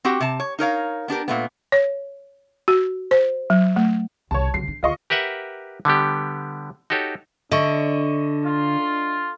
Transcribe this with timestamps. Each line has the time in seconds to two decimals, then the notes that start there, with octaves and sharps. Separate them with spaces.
0.05 C4 F#4 G4 F#5
0.21 C3 A5
0.40 C#5
0.59 D#4 A#4 C#5 F5
1.08 B3 D4 G4 A#4
1.28 A#2 A3 B3
1.72 C#5
2.68 F#4
3.11 C5
3.50 F#3
3.76 A3
4.31 C2 C3 C#5 A5
4.54 C#3 F#3 C7
4.67 D4
4.83 D2 F4 D#5 C#6
5.10 G4 A#4 B4 E5 F#5
5.85 D3 G3 B3 G4
6.90 D#4 F#4 G4 A4 C#5
7.51 D3 D4 D#5 E5 C#6
8.44 F4